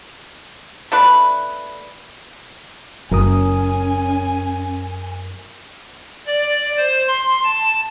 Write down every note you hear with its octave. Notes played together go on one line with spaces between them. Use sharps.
A3 D4 B4
F#1 F#2 C#4 A#4 G#5 D#6
D5
C5
C6
A5